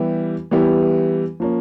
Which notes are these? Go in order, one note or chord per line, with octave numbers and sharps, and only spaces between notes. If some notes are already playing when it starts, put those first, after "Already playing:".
Already playing: E3 G3 B3 E4 G4
E3 G3 B3 E4 G4
F3 A#3 C#4